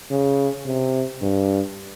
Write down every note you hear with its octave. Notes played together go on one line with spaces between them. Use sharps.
C#3
C3
G2